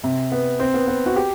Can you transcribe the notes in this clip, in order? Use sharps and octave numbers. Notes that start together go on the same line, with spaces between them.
C3
B3
C4
B3
B3
F#4
G4